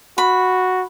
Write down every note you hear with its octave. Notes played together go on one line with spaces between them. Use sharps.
F#4 B5